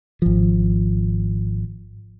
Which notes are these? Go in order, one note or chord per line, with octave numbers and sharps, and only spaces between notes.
G#1 F3